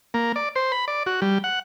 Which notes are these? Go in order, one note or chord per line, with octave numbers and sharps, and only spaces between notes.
A#3
D5
C5
B5
D5
F#4
G3
F#5